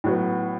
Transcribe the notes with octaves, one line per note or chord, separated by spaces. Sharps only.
A2 F#3 B3